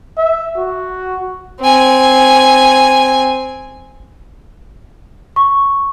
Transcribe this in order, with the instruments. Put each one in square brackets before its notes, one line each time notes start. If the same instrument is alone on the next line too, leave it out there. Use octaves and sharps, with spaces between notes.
[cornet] E5
F#4
[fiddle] C4 G#5
[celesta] C#6